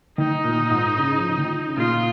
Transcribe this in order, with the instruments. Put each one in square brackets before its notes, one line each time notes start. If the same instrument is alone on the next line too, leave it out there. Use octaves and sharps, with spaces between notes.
[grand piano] D#3 [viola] D#4
[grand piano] A#2
G#2
C#3
F3
D#3
C#3
[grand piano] A#2 [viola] F4